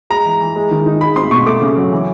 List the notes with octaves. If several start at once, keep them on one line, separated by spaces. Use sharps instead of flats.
G#3 A#5
E3
E3
G#3
D#3
D#4
G#3 B5
C4 C6
B2 C#6
A3 D6
C#3
F#3
E3